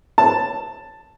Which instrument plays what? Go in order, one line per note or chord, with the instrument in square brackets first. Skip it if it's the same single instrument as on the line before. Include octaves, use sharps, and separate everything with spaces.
[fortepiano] A5